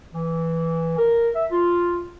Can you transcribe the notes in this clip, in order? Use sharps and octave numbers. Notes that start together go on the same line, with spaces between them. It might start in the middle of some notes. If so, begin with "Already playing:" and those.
E3
A#4
E5
F4